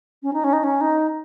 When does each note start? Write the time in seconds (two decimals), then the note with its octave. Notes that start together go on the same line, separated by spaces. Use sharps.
0.23 C#4
0.33 D#4
0.44 C#4
0.53 D#4
0.64 C#4
0.81 D#4